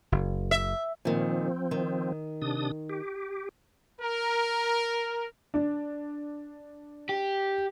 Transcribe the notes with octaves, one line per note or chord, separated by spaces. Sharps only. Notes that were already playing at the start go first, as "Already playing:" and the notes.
F#1
E5
A#2 D#3 F3 C4
D#3
C3 D4 D#6
G4
A#4
D4
G4